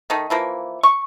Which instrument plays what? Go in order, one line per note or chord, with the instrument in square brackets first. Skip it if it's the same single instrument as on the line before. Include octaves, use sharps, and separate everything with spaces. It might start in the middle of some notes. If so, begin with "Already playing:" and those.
[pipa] D#3 A3 D#4
E3 F3 A#3
C#6